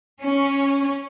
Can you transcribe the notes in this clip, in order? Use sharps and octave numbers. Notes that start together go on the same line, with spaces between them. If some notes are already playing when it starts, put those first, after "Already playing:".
C#4